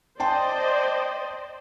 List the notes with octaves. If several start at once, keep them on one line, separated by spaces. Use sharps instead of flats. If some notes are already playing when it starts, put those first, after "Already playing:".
C5 D5 D#5 G5 A5 C6